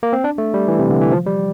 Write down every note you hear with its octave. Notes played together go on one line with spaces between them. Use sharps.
A#3
C4
D4
A3
G3
E3
C3
D3
E3
F3
G3